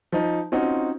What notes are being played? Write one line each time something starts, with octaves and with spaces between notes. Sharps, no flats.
F3 D#4
C4 C#4 D#4 F4 F#4